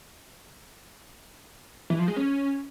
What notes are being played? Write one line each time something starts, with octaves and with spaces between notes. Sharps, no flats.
E3
F3
G#3
C#4